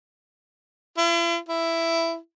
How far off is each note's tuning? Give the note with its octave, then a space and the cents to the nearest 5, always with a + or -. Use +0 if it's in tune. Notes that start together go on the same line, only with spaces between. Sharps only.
E4 +45
E4 +10